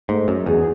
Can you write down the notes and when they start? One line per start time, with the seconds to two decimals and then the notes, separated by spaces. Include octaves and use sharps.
0.09 G#2 A3
0.28 F#2
0.46 E2 G#4